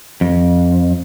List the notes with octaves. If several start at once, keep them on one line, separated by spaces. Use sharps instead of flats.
F2